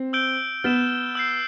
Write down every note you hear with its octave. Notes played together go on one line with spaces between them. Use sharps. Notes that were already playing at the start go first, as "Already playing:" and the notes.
Already playing: C4
E6 G6 D7 G7
B3 F6 A6 E7
E6 G6 C7